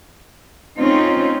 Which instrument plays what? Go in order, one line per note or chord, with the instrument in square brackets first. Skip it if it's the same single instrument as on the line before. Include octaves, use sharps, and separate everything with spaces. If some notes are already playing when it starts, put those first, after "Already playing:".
[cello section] A3 C4 C#4 D#4 F4